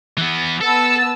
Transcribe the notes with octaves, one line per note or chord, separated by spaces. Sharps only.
E3 B3
B3 A4 A5 E6